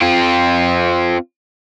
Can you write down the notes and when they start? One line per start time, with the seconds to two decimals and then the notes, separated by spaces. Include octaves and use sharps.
0.01 C4 F4